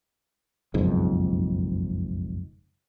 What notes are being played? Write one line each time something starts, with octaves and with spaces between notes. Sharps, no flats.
F#1 B1 F2 G#2